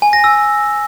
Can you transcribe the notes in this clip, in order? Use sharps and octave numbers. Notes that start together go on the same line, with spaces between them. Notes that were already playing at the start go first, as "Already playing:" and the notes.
G#5
A#6
E6